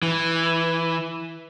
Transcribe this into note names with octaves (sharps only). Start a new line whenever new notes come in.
E3